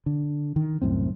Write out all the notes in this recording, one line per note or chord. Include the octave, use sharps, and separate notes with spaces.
D3
D#3
C2 F#2 A2 C4